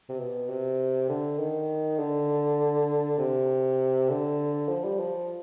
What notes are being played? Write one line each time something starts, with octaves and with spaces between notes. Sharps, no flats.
C3
B2
C3
D3
D#3
D3
C3
D3
F3
G3
F3